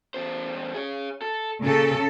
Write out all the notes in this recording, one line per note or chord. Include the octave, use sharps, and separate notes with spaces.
E2 C5
G#4 C#5
A4
A#2 C#3 A4